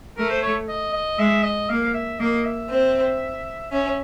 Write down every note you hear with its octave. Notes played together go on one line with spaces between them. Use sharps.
A3 A#4
C5
C#5
D#5
D#5
G#3 E5
D#5
A#3 F5
E5
A#3 D#5
E5
C4
C#4 E5